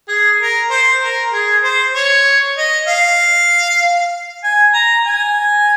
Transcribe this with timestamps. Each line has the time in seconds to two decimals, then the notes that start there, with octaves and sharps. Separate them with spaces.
0.08 G#4
0.40 A#4
0.71 C5
1.02 A#4
1.33 G#4
1.63 C5
1.94 C#5
2.57 D#5
2.88 F5
4.43 G#5
4.74 A#5
5.05 G#5